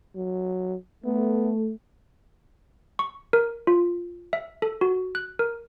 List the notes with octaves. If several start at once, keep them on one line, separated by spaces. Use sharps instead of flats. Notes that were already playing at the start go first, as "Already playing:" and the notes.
F#3
A3 B3
C#6
A#4
F4
E5
A4
F#4
F#6
A#4